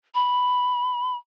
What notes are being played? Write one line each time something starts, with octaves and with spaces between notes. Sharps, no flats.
B5